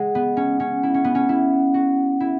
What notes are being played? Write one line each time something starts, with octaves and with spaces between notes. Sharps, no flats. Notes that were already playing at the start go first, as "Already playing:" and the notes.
Already playing: G#3 F#5
B3
C#4
C#4
E4
C#4
B3
C#4
E4
F#4
E4